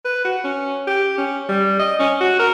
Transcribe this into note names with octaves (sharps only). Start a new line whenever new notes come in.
B4
F#4
C#4
G4
C#4
G3
D#5
C#4
F#4
A#4